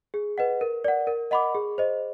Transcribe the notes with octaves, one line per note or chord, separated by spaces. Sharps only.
G#4
B4 D#5 F#5
A#4
D5 F#5
A#4
D#5 F#5 B5 D6
G#4
C5 D#5